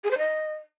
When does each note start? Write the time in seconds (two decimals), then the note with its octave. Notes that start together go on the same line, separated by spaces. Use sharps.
0.04 G#4
0.11 C5
0.18 D#5